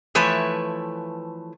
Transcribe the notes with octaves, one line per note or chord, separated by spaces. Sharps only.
E3 F3 A3 B4 C#5